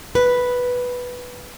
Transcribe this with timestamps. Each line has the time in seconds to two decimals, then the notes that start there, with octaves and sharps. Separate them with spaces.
0.15 B4